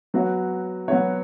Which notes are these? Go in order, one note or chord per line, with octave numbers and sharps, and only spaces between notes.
F#3 B3 F#4 C#5
F#3 B3 F#4 C#5